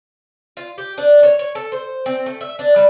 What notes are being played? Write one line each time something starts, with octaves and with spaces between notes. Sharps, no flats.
F4
G4
D4
C#5
C#5
A4
C5
C4
A3
E5
D4
G3